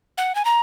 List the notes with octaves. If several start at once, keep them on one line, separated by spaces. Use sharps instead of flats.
F#5
G#5
A#5